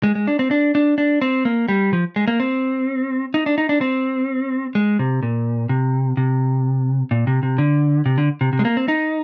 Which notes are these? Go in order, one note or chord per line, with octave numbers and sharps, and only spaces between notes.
G#3
G#3
D4
C4
D4
D4
D4
C4
A#3
G3
F3
G#3
A#3
C4
D#4
D4
D#4
D4
C4
G#3
C3
A#2
C3
C3
A#2
C3
C3
D3
C3
D3
C3
C3
G#3
A#3
C4
D#4